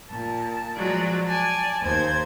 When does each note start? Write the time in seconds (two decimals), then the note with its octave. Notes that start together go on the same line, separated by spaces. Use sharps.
0.10 A#2 A5
0.76 F3 F#3 G#3 D5
1.27 D5 G#5 A5
1.82 D#2 C5 G#6